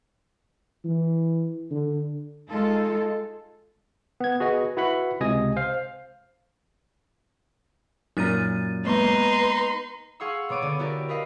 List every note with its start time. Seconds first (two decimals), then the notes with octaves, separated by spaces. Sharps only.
0.85 E3
1.71 D3
2.50 G#3 D#4 F4 A4
4.20 B3 G#6
4.40 F#4 G#4 B4 D#5
4.77 E4 F#4 B4 F#5 B5
5.20 C#2 C3 D#5 G#5 D#6
5.56 C5 F5
8.17 F#2 A#2 D#4 A#4 A6 D#7
8.85 G#3 A#3 B3 D#4 B4 C6
10.20 G#4 F5 F#5 C6 C#6 E6
10.49 B2 B3 C#5 D6 D#7
10.62 D3 B3 D5 D#7
10.79 E4 F#4 G4 A#4 D5
11.08 A#4 B4 D#5 F5